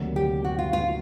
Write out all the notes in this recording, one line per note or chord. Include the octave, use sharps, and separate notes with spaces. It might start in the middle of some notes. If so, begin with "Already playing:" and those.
Already playing: D2 C3 D#3 F#3 A#3
G4
F#4
F4
F4